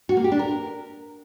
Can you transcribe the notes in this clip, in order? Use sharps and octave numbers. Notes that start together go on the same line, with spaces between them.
F#4
A#3
G4
D4
A#4